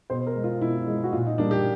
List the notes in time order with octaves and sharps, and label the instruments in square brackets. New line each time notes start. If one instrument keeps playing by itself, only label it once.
[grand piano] B2 C5
A#4
G#3
F4
B2 E4
G#3
F#4
A#2 F4
D#4
G3 A#3 D4
G4